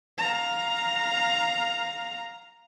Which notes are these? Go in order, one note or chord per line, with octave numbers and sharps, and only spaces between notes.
F5 A#5